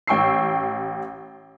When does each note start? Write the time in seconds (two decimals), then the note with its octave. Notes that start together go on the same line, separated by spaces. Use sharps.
0.07 A1 G5 C#6 E6 C7